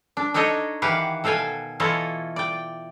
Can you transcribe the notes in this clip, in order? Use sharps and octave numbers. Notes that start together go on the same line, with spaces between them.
D4
D4 D#4 A4 C#5 D#5
D#3 E3 G4 B4 F5 F#5
B2 A4 F5 G5 G#5
E3 E4 F4 A4 C#5 D#5
D5 G5